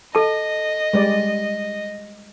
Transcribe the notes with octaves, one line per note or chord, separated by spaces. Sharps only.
A4 D#5 A5
G3 G#3 D5